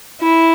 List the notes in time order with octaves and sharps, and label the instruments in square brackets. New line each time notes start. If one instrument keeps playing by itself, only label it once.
[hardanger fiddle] E4